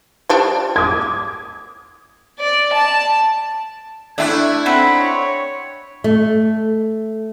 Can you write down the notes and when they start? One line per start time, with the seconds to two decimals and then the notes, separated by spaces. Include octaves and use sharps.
0.29 F3 G3 D4
0.76 D6 D#6 G#6
2.39 D5
2.73 A5
4.18 A3 D4 E4 A5 F#6 G#6
4.66 C4 D#4 F#5 B5
5.00 C#5
6.04 A3